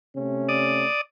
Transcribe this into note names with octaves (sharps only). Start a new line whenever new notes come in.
C3 A3 C#4
D5 D#6